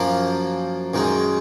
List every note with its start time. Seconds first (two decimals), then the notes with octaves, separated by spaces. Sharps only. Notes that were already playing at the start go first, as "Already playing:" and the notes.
Already playing: F#2 F3 A#3 F4
0.94 F#2 D#3 G#3